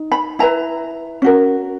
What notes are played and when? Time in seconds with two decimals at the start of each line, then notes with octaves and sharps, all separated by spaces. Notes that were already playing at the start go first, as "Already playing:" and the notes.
Already playing: D#4
0.12 B5
0.39 E4 B4 A#5
1.22 C#4 F#4 A#4